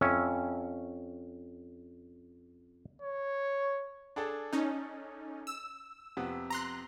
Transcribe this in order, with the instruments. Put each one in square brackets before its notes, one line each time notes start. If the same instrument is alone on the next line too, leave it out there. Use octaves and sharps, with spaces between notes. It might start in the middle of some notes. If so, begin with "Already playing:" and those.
[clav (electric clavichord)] F2 C#4 E5
[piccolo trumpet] C#5
[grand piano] D4 G#4 A4
[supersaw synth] C#4 D#4
E6
[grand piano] F2 C3 B3
[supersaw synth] A#5 C6 F#6